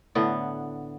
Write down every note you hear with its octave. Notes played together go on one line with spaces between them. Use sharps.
A2 D3 B3